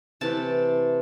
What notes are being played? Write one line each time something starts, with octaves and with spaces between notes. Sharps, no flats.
C3 E3 A3 A5